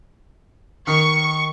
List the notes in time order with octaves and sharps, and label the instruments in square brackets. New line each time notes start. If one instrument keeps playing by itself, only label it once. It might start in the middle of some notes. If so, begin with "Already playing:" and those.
[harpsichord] D#3 [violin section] C#6